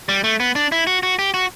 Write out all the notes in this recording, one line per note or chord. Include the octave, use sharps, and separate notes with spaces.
G3
A3
B3
D4
E4
F#4
F#4
G4
F#4